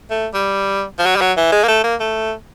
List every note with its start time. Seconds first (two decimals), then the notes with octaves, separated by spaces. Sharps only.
0.10 A3
0.34 G3
0.99 F3
1.06 F#3
1.16 G3
1.21 F#3
1.37 E3
1.52 G#3
1.64 A#3
1.68 A3
1.84 A#3
2.00 A3